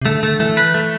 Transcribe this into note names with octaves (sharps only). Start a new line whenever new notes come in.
C3
D3 A3
D3 A3
E3 A3
B4
A3